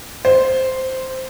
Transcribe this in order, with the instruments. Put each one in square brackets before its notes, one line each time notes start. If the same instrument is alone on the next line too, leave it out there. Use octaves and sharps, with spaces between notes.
[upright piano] C5